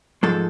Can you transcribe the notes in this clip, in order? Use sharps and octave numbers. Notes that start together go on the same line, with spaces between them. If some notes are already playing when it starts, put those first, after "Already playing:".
G#2 F3 G#3 A4